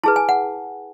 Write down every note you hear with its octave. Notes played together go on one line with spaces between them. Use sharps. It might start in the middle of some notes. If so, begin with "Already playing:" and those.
E4 G#4 B4 A5
G#5
F#5